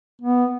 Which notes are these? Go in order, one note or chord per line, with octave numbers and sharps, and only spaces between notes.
B3